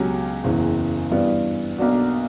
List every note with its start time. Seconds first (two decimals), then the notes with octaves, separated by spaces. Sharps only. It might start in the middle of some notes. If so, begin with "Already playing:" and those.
Already playing: C#2 B2 F#3 C#4 G4
0.44 F#1 E2 C#3 E3
1.11 G2 E3 G3 B3
1.78 B1 B2 A#3 D4 F#4